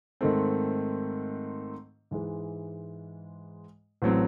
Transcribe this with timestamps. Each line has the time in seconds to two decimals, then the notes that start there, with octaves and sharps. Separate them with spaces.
0.21 G#2 D#3 A3 C4
2.11 G#2 E3 G#3
4.02 A1 A2 F#3 C4